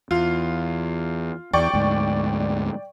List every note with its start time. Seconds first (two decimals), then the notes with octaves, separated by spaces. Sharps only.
0.11 E2 F4
1.53 E2 D5 G5 C#6
1.73 D2 G#2